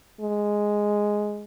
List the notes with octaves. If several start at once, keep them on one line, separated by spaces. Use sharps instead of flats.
G#3